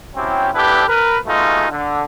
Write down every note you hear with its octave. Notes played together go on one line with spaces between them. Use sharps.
F#3 C4 C#4 E4 G4
B3 D4 E4 G4 A4 B4
A#4 B4
B2 G#3 A3 D#4 F4
D3